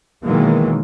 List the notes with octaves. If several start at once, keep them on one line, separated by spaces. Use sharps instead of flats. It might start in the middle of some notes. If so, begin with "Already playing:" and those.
B2 D#3 E3 F#3 G#3 A#3